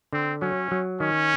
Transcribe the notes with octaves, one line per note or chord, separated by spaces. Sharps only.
D3 C4
F#3 C#4
F#3
D#3 C#4